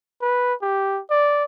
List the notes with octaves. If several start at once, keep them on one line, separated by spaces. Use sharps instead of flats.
B4
G4
D5